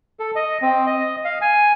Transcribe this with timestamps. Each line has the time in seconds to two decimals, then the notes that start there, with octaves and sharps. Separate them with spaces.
0.20 A4
0.36 D#5
0.62 C4
0.86 D#5
1.25 F5
1.41 G#5